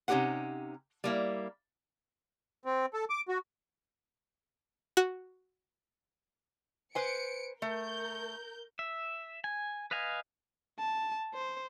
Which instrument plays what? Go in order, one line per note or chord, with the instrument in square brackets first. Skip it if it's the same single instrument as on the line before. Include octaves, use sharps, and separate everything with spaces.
[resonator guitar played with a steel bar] C3 C#4 D#4 G4 B4 F#5
G3 A#3 E4
[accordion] C4
A4
D6
F#4
[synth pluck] F#4 F#6
[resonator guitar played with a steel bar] B4 C5 G#5 [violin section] C#7 D7
[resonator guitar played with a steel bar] A3 [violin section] A#4 G6
[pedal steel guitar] E5
G#5
B4 D#5 F5 G#5
[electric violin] A5
C5